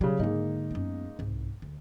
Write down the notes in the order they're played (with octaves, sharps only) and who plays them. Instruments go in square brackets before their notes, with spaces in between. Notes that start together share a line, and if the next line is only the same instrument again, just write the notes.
[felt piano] C#3 G3 [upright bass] F#3
[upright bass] G#2 D3 [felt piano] G#3 A#3 D#4
[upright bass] F#2 B3
C2 G#2
D2